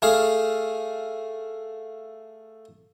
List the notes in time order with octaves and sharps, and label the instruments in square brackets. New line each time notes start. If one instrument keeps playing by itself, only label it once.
[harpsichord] A3 G#4 F5